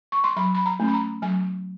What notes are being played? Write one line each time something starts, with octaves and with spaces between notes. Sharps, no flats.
C#6
C6
F#3 B5
B5
A#5
A3 C#4
B5
A#5
F#3 G#5